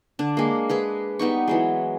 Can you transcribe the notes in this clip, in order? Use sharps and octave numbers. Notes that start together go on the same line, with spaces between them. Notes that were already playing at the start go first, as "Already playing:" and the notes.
D3 D4
G#3 A#3
G#3 G#4 B4
G3 B3 D#4 C#6
E3 F#3 G#3